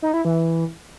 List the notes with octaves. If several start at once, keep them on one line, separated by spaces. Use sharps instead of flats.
D#4
E4
E3